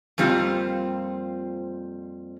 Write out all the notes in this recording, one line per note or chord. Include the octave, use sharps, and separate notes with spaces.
F2 A#2 G3 C4 F4 C5